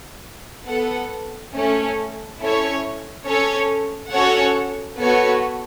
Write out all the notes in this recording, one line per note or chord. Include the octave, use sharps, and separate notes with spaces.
B3 A4 F#5
A3 C#4 A4
C#4 E4 A4 C#5
C#4 A4 C#5
C#4 F#4 A4 C#5 F#5
B3 F#4 A4 C#5